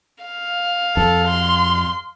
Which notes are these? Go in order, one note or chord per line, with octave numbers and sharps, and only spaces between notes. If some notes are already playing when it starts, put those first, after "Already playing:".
F5
F2 A4
C6